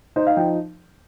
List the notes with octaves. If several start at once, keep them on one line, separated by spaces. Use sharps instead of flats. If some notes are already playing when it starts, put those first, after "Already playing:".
D#4 C5
F5
F3 G5